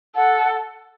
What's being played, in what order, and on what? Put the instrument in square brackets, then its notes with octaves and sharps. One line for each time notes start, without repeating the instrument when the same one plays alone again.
[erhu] A4 [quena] F#5